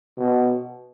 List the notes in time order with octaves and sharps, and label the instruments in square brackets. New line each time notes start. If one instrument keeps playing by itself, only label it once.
[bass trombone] B2